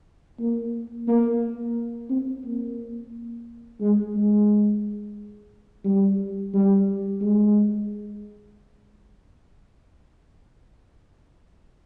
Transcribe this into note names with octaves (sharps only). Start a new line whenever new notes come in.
A#3
A#3
C4
A#3
G#3
G#3
G3
G3
G#3